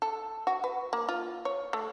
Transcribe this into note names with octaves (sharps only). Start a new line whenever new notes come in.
A4
F#4
B4
A#3
F4
C#5
A3